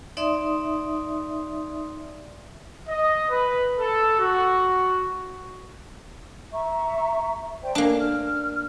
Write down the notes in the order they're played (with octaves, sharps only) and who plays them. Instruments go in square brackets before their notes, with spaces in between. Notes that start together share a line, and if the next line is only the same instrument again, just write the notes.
[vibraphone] D#4 D5 E5 C6 D#6
[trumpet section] D#5
B4
A4
F#4
[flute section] E5 A#5 C#6
C5 D5 G5
[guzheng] A#3 D4 [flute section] C#4
[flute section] F6